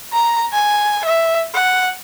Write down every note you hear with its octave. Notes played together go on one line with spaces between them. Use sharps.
A#5
G#5
E5
F#5